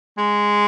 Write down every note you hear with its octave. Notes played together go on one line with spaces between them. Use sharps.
G#3